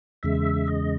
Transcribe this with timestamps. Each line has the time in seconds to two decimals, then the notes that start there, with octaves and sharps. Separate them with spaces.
0.23 E2 C#3 G#3 E5
0.67 D#5